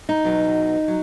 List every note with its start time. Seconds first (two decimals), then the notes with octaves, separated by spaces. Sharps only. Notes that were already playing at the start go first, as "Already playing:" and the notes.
0.09 D#4
0.25 E2 B2 F#3
0.88 F#3